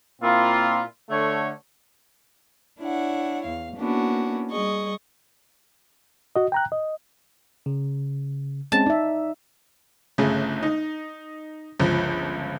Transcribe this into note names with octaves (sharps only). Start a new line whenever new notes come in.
A#2 A#3 C4 E4 F4
D3 A3 C#5
D4 E4 C#5 F#5
E2 F5
A#3 B3 C#4 D4 E4 F#4
G3 G#4 D#5 C#6
F#4 D#5
G5 A#5 F#6
D#5
C#3
G#3 C4 C#4 A5
D#4 D5 E5
G1 C#3 A3 G#4
D#4
G1 C#2 F3